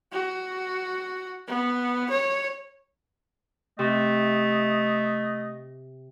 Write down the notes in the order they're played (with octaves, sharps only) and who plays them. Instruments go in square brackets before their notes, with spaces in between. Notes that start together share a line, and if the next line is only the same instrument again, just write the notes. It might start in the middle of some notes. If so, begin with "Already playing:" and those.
[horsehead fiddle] F#4
B3
C#5
[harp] C3 [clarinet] A3 [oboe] D#5